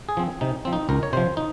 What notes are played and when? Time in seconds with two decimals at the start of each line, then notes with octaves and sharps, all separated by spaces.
0.09 G#4
0.17 F3 C4
0.41 C3 D#4
0.65 F3 C4
0.73 D#4
0.89 C#2 A#4
1.03 C#5
1.13 C3 F3 C5
1.37 D#4